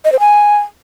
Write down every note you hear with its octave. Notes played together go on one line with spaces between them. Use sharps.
D#5
C5
G#5